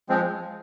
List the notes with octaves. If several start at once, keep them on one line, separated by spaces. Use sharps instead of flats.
F3 G#3 C4